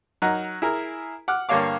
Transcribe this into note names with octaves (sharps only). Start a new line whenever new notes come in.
F#3 D#4 A#4 F#5
E4 G#4 A#4
F#5 D6 F6 F#6
G2 D3 A#3 C#5 F5 D6